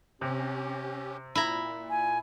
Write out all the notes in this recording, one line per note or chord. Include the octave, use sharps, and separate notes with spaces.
C3 C#4 G4
A#2 E4 A#5
G#5